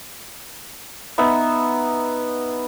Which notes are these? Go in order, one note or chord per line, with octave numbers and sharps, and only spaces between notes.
B3 D#4 E5